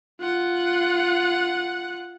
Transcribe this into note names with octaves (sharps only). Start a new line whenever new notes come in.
F4 F#5